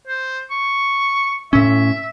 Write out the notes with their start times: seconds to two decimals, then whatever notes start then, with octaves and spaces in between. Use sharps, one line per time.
0.07 C5
0.50 C#6
1.53 A2 C#4 E5